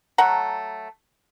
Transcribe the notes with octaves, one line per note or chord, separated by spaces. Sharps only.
F#3 A3 F#5 A#5